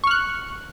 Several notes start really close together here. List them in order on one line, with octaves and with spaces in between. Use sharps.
C#6 F6 F#6